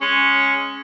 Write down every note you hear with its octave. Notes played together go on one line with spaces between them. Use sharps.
G#3 C#4